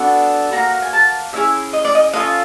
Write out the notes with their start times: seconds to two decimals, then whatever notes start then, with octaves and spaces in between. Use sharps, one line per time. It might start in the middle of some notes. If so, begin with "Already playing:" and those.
Already playing: B3 D4 F#4 A4
0.52 A#3 D4 F#4 A#5
0.82 G#5
0.93 A5
1.33 A#3 C#4 E4 G#4 E5
1.73 D#5
1.85 D5
1.95 D#5
2.13 C#4 F4 A4 D#5